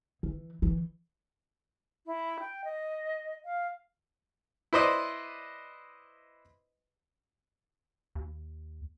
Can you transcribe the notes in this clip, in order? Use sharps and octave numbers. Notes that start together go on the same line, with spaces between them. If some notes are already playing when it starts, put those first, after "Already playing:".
E3
E3
E4
G5
D#5
F5
E4 B4 C5 D5 D#5
D#2